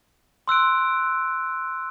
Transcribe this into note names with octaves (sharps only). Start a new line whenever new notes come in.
C6 E6 F#6 D7